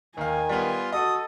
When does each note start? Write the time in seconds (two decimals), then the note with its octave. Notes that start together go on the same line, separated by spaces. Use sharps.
0.17 D#2 D#3 F5 G#5
0.49 G3 B3 F4
0.92 F#4 A4 D#5 F#5 D#6